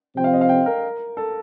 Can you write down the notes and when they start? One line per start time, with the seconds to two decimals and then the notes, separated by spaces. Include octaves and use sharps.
0.16 C3 F3 C4 G5
0.24 F5
0.33 D#5
0.41 F5
0.49 G5
0.66 A#4
1.17 A4